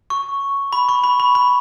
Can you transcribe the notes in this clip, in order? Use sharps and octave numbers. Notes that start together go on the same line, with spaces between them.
C#6
B5
C#6
B5
B5
B5